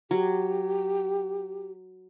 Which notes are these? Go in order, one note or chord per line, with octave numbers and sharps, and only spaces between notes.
F#3 G4